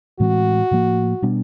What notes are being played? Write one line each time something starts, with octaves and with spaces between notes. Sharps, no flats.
A2 E3 G#3 C4 F#4
A2 F3 A#3
B2 G3 B3 D4